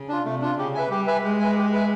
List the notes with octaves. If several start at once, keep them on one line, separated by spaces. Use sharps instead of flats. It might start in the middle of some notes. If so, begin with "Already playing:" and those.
Already playing: C#3
D4 F4
C3 A3
D4 F4
C#3 G4
B4 E5 G#5
G3 G4
B4 E5 G#5
G#3 G4
B4 E5 G#5
G4
B4 E5 G#5